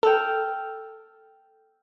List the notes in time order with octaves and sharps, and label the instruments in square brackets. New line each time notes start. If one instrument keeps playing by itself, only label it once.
[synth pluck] A4 [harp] G5 E6 F6